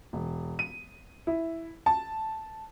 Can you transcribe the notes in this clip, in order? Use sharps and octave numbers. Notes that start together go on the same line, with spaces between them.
E1
D#7
E4
A5